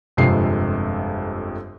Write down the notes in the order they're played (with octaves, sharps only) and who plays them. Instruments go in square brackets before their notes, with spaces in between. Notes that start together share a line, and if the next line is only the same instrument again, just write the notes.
[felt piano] G1 F2 C3 G#3 C7